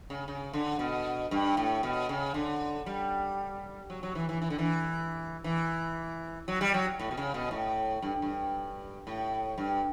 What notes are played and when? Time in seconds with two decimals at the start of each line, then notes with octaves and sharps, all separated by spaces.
0.10 C#3
0.28 C#3
0.53 D3
0.79 B2
1.31 G2
1.57 A2
1.83 B2
2.09 C#3
2.34 D3
2.86 G3
3.90 F#3
4.03 F#3
4.15 E3
4.29 E3
4.42 E3
4.50 D3
4.58 E3
5.44 E3
6.48 F#3
6.61 G3
6.74 F#3
6.99 A2
7.11 B2
7.17 C#3
7.34 B2
7.51 A2
8.02 G2
8.22 G2
9.07 A2
9.58 G2